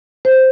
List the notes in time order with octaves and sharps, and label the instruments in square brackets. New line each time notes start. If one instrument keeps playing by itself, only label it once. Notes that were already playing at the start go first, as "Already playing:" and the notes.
[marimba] C5